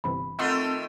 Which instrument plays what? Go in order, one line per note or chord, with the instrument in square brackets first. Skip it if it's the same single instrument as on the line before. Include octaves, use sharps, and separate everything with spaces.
[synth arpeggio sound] G1 C3 E3 [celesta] B5
[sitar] D#3 A3 F4 [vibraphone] C4 [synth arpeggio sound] D#5 F#5 C6